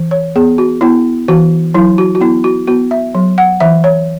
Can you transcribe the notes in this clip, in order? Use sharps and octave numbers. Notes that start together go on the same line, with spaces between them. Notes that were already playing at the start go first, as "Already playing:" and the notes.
Already playing: E3
C#5
B3 G#4
F#4
B3 E4
E3 F#4
F#3 E4
F#4
F#4
B3 E4
F#4
B3 F#4
E5
F#3
F#5
E3 E5
C#5